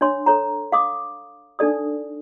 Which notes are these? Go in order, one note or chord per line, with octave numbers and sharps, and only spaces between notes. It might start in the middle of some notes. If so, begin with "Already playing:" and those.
D4 C#5 C6
A4 C#5 A#5
F5 D6 D#6
D4 D#4 A4 D5 D#6